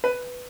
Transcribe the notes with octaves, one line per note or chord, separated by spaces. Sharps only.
B4